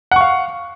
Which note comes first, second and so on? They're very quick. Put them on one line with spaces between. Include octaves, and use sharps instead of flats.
F#5 C#6 F5